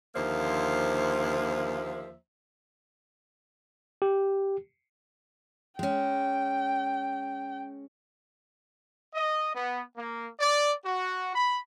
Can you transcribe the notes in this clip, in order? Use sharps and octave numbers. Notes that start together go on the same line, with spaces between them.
D#2 D3 F3 A#3 C5 E5
G4
G#3 C#4 G5
D#5
B3
A#3
D5
F#4
B5